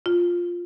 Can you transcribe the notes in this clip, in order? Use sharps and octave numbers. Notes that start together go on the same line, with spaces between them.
F4